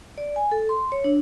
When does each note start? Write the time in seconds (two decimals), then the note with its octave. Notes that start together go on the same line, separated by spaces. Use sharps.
0.18 D5
0.36 G#5
0.52 A4
0.69 C6
0.92 C#5
1.04 D4